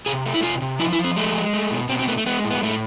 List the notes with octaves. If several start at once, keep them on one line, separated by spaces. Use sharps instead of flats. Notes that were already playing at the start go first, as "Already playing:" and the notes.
C3 G#4
A3
E4
C3 F4
C3
F3 E4
E4
F3
C4
G#3 A3
G#3
A3
B2
B2 C4
C4
A3 B3
A3
G#3 B3
A2
B3
A2 A3